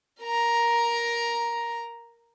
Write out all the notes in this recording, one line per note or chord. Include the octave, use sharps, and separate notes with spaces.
A#4 A#5